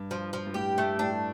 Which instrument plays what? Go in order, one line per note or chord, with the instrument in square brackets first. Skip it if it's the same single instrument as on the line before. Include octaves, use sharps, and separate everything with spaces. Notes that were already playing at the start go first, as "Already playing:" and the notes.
Already playing: [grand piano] G2
[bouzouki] F3
F3
[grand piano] G2
[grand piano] A2 [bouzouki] G4
[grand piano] A2 [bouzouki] A3
[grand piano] A2 [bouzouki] D4